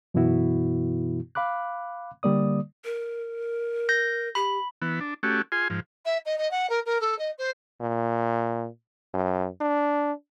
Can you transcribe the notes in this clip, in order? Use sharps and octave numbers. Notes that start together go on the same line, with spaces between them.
F#2 B2 E3 B3 E4 F#4
F5 B5 D6 F#6
D3 G3 A#3 D5 D#6
A#4
G6 A#6
G4 B5
E3 B3
D4
A3 C#4 F#4 G4
F4 G#4 G#5 C6
G#2 F3
E5
D#5
D#5
F#5
A#4
A#4
A4
D#5
C5
A#2
F#2
D4